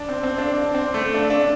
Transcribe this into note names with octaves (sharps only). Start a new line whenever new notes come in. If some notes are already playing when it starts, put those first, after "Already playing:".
Already playing: D4
C4
C4
D4
D4
C4
A3
D4
D4